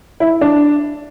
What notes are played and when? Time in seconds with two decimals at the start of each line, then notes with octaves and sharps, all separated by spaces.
0.20 E4
0.41 D4